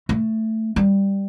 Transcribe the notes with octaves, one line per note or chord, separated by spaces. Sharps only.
A3
G3